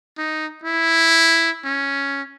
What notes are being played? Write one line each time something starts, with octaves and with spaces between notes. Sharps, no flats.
D#4
E4
C#4